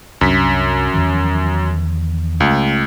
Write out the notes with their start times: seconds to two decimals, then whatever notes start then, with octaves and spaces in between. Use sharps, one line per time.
0.21 C2 F#2 D4 B6
0.94 E2 D#3 F3
2.40 C#2 A3